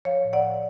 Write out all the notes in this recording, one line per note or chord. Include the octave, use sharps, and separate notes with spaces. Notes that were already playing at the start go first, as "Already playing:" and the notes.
F3 C#5 F5
A2
D5 F#5
A2